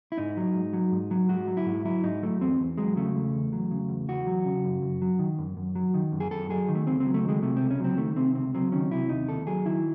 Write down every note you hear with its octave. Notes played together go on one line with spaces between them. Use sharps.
E4
G#2 D#4
F#3
G#2
F#3
G#2
F#3
G#2 F#4
F#3
E4
G#2
F#3 E4
G#2 D#4
F#3 A3
E2 C4
E2
F#3 G#3
C#3 A3
E2
E2
F#3
C#3
E2
E2 F#4
F#3
C#3
F#2
F#2
F#3
D#3
F#2
F#2
F#3
D#3
F#2
G#4
F#2 A4
F#3 G#4
D#3
A3
C#2 C4
C4
F#3
A3
D#3 G#3
C3 A3
C#2 C4
C#4
F#3 C4
D#3 A3
C3 C4
C#2 C4
F#3 C4
D#3 C#4
C3 E4
D#2 D#4
D#2 A4
F#3 G#4
D#3 E4